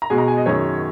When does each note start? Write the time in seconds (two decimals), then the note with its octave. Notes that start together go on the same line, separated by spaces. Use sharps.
0.02 A#5
0.10 B2 G#3 G#5
0.18 A#5
0.28 G#5
0.37 D#5
0.46 F#2 D#3 G#3 C#5